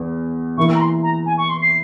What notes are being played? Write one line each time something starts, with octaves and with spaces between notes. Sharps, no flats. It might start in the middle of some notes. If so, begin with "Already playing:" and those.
Already playing: E2
E3 A#3 E4 C#6
A#5
C6
A#5
G#5
C#6
C6
C7